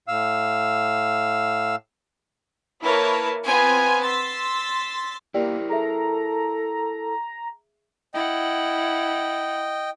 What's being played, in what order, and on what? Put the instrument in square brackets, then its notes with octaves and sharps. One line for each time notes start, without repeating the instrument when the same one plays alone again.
[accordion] A2 F5 E6
[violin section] A#3 E4 A#4 B4 C#5 A5
B3 C4 F4 G#5
C6 E6 A6 B6
[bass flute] A#3 [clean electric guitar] E4 A#4 C5 [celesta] G4 D5 G5
[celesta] G#4 E5 [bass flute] A4 [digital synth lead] A#5
[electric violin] E4 F#5 [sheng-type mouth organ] D#5 G5